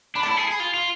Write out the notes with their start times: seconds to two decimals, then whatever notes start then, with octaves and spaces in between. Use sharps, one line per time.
0.15 D4 B5
0.23 A5
0.26 E4 B5
0.37 G#4
0.48 G#4
0.60 F4
0.74 F4